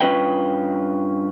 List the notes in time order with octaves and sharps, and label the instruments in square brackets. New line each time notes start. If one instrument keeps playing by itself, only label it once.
[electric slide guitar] G2 C#4 F4 B4 D#5 G5